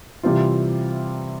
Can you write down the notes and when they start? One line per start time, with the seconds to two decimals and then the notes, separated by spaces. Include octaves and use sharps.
0.23 C3 E3 G3 C4 F4